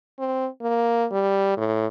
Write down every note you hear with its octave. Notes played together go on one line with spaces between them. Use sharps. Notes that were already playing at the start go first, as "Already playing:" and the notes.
C4
A#3
G3
A2